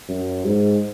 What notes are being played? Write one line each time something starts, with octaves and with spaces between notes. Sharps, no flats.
F#2
G#2